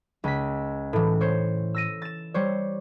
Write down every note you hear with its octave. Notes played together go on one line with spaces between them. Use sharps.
C#2 B6
A2 E3
C5 C#5
E6 A#6 D#7
A6 E7
G3 C5 C#5